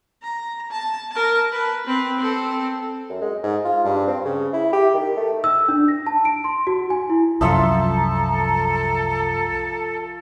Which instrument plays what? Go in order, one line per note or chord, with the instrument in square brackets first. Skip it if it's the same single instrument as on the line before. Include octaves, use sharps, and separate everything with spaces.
[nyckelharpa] A#5
A5
A#4 A5
B4
C4 B4
C4 A4
[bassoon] F#2
G#3
G#2
F4
G2
C4
C#3
E4
G4
D#3
A3
[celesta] E6
D4
A#6
A5
D7
C6
F#4
G#5
E4
[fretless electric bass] C2 F#2 [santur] F3 E5 C6 [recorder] A4 [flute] A#5